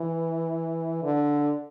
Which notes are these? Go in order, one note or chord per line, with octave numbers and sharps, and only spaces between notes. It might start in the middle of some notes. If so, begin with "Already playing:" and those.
Already playing: E3
D3